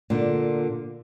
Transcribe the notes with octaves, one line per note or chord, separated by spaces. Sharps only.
A#2 D3